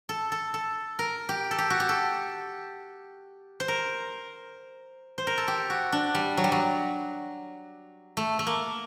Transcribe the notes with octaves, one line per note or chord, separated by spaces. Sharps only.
A4
A4
A4
A#4
G4
A4
G4
F#4
G4
A4
C5
A#4
C5
A#4
A4
G4
F#4
D4
G3
F#3
G3
F#3
A3
A3
A#3